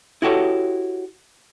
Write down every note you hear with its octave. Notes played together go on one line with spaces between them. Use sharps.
E4 F#4 G4 A4 C#5